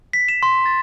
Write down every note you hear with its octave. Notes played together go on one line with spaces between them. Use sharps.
B6
E7
C6
A6